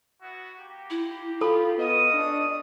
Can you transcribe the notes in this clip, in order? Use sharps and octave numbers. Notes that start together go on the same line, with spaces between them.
B3 E4 F#4
A#3 G4
E4
F4 A4 B5
B3 C#4 D#5 D#6
D4